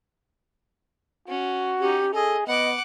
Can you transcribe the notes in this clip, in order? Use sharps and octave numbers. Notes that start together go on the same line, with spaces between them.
C#4 F#4
C#4 D#4 G4
G#4 A4 D#5
B3 D#5 F#5 D6